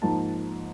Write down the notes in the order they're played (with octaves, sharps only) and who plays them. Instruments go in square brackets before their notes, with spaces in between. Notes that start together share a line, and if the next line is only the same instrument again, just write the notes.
[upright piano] G#2 F3 A#3 D#4 A5